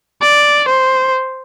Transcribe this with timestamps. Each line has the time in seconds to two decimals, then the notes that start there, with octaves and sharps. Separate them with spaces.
0.22 D5
0.68 C5